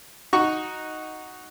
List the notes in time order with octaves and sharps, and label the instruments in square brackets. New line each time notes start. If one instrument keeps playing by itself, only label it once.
[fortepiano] D#4 F#4 C#6